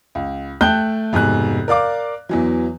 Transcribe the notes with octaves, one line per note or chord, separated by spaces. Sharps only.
C#2
A3 G5 A5 F#6 G6 G7
F1 G#2 B2 G#5 F#6
A#4 D5 F5 D6
E2 E3 F#3